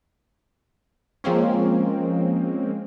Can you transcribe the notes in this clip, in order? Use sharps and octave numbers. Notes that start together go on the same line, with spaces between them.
F3 G#3 A#3 C4 C#4